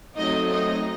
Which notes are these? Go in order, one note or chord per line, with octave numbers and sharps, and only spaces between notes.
F#3 A3 C4 D#4 D#5
D#4 D#5